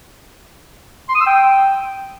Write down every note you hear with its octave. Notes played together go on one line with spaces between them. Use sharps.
C6
D#6
E6
G5